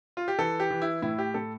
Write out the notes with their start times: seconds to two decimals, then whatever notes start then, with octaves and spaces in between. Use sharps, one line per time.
0.17 F4
0.28 G4
0.38 E3 A4
0.60 G4
0.70 E3
0.82 E4
1.02 A2 E4
1.19 G4
1.34 A2 A4